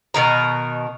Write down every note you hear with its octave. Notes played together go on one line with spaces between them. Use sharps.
B2 D#3 A#5